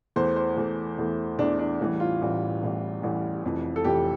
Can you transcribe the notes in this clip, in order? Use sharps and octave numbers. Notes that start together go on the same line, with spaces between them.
E2 E3 A3 C5
C5
E2 E3 A3
E2 E3 A3
E2 E3 A3 D4
D4
A1 A2 E3 G3
F4
A1 A2 E3 G3
A1 A2 E3 G3
A1 A2 E3 G3
F1 F2 E3
A4
F1 F2 E3 G4